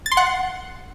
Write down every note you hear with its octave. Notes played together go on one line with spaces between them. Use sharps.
A6
C6
F#5